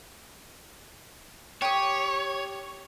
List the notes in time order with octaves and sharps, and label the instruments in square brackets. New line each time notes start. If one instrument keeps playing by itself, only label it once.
[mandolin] G4 D#6 [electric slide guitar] C#5